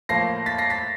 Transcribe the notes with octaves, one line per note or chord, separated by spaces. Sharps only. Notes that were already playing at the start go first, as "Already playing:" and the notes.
A2 F3 A#3 A#6 C7
A6 B6
A#6 C7
A6 B6